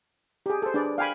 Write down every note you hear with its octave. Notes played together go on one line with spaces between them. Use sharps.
G4 G#4
A4 C5
D4 G#4 B4 D5
F5 G5 G#5 B5